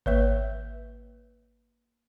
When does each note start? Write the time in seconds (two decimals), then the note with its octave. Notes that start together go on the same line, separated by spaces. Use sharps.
0.06 G#1 A#3 B4 C#5 E5